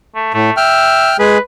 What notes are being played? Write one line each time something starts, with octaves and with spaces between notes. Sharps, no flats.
A3
A2 A3
E5 G5 F6
G#3 G#4 B4